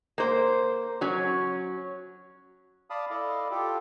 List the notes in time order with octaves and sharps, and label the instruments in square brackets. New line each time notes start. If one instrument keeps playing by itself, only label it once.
[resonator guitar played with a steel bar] A#3 C5
F#3 C#4
[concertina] D5 F5 A5 B5 D#6
E4 A4 D5 D#5 F5
F4 G4 A4